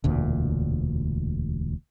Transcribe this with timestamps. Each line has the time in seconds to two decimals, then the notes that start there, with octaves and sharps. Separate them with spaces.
0.04 E1 D2 A#2